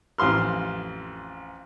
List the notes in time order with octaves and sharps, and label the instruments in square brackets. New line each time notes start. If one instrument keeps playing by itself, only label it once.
[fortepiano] A1 F2 F5 C6 F6